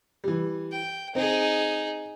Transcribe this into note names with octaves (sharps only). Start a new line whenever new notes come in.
E3 G3
G5
C4 D#4 G#4